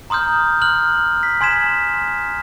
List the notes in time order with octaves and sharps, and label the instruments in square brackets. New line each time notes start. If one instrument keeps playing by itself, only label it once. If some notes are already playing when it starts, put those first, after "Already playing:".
[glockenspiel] A#5 C6 D#6 F6 G6
F6 F#6 F#7
B6
G#5 C6 G#6 B6 E7